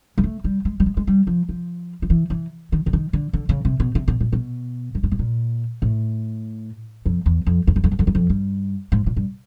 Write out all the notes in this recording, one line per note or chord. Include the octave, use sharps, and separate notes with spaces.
G#3
A3
G3
G#3
G3
G#3
G#3
G3
F3
F3
F3
E3
E3
D#3
D3
D#3
D3
D3
C#3
C3
B2
C3
B2
A#2
B2
G2
G#2
A2
A#2
A2
F2
E2
F2
F2
F#2
F2
F#2
F2
F#2
F2
G2
G#2
A#2
G2